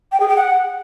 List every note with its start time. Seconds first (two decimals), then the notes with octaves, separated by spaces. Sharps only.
0.12 G5
0.20 G#4
0.28 G5
0.36 F#5